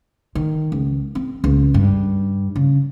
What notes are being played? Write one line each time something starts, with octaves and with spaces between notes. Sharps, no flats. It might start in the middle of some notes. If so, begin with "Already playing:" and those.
D#3
C#2
C4
C#2
G2
C#3